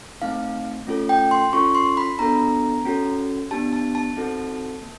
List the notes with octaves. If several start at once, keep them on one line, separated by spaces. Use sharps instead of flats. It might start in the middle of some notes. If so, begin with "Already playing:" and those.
A3 C4 D#4 F5
A3 C#4 F4 A4
G5
C6
C#4 F4 A4 C#6
C6
B5
B3 D4 F#4 A4 A#5
C#4 F#4 A4
B3 D4 G4 A5
A5
A5
C4 D#4 F#4 A4
A#3